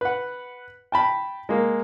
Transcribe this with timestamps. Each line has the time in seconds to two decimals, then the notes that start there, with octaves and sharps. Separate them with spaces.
0.01 B4 F#5
0.92 G5 A5 B5
1.49 G#3 A#3